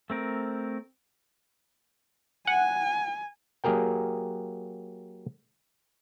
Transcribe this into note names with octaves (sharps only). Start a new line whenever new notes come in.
A3 C4 A#4
F#5 G#5
F#3 A#3 G4 G#4 A#4 G5